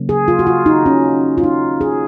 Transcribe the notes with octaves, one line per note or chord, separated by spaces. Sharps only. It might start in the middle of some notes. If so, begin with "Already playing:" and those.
Already playing: C#3 F#3 A#3
G#4
F4
F#4
F4
D#4
C#4
F4
D#4
G#4